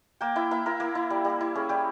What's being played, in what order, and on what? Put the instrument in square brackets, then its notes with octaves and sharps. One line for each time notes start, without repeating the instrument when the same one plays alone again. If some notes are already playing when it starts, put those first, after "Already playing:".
[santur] A#3 G5
E4 E5
A#3 E5
E4 A#4
A#3
E4
G3
G3
E4
C#4 G#4
G3 G4